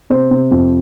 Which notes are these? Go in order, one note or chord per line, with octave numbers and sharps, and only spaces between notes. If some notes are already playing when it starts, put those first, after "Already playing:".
C3 C5
C3
F2